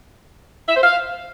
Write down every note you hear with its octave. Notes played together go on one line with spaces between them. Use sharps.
E5
C5
F5